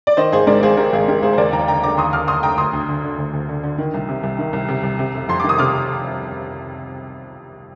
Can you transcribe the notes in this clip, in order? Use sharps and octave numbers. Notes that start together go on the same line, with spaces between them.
D5
D#3 C5 D#5
G#1 G#4 C5
G#2 A#4 D5
G#1 G#4 C5
D#3 G4 A#4
G#1 G#4
G#2 G4 A#4
G#1 G#4 C5
C5
D#2 A#4 D5
D#2 G5 A#5
D3 G5 A#5
D3 A#5 D6
D#2 C6 D#6
D#2 D6 F6
D3 C6 D#6
D3 G5 A#5
D2 C6 D#6
D2
D3
D3
D2
D2
D3
D3
D#3
C2
C3
C2
D#3
C2
C3
C2
C3
F1
F2 C6
D#3 D6
D#6
C3 D6 F6